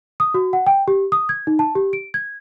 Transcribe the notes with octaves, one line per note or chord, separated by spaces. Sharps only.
D#6
F#4
F#5
G5
G4
D#6
G#6
D#4
A5
G4
D7
G#6